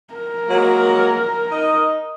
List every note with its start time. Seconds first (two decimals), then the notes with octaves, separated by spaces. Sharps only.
0.14 A#4
0.47 F#3 G#3 A#3
1.49 D#4 D#5